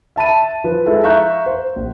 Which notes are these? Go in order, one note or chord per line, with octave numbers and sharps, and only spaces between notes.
E5 A5 B5 D#7
F3 B4
G#3 E4 A4
E5 F5 A#5 C#6 F#6 G6
C5
A#1